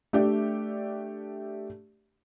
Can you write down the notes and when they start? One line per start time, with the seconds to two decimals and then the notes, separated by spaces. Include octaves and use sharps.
0.13 A3 D4 G4 D5 E5